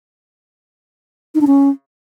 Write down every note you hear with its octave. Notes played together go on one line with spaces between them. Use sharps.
D#4
D4
C#4